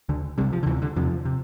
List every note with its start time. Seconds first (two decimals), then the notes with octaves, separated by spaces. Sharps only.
0.09 D2 D3
0.38 C2 C3 G3
0.53 F3
0.63 D3
0.66 D2 C3 E3
0.82 D3
0.96 E2 C3 F3
1.25 C3